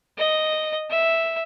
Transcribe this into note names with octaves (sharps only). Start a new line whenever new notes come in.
D#5
E5